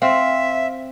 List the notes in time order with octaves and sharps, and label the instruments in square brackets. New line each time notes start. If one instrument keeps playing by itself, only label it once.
[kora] C4 [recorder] E5 [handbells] F5